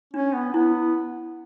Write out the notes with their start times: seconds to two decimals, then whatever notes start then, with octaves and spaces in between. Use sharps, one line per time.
0.14 C#4 D4
0.34 B3
0.54 B3 E4